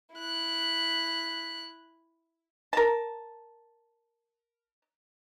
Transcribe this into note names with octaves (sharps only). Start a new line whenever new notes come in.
E4 F#6
A#4 A5